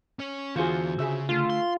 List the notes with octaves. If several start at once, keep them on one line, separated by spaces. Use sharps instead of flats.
C#4 C#5
E2 D3 E3 F4 F#4 G#4 C5
C#3 G#4 E5 E6
D3 A3 F4
C6